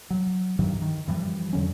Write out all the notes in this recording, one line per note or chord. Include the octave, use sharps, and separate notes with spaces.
F#3
G2 D#3 E3 F#3
D#3
F#2 E3 F3 G3
F2 D3 F#3 C#4